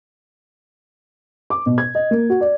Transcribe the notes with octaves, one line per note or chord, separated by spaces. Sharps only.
D6
B2
G#6
D#5
A#3
F#4
D5